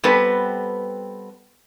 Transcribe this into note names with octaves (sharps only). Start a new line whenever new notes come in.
G3 B3 C4 A4 B4